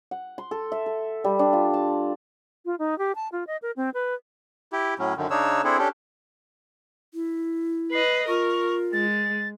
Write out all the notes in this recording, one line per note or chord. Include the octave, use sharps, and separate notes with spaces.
F#5
C6
A4
E5
A4
G3
D4
F4
A5
F4
D#4
G4
A5
F4
D#5
A#4
C4
B4
E4 G4
A2 F#3 C#4
F#2 D3 D#3
C#3 D4 D#4 C#5 E6
C4 D4 E4 G#4 A4
C#4 D4 G4 A4
E4
B4 D#5 C7
F4 A#4 C#6
G#3 A6